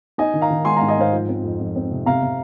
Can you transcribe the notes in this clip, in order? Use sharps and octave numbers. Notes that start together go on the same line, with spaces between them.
D#4 D#5 G#5
D#3
F5 A#5
D#3
G#3 G#5 C6
G#2 F5 A#5
D#5 G#5
G#2 C5 F5
F3
C4
F2
F2
C4
C3
C3 F5 A#5
C3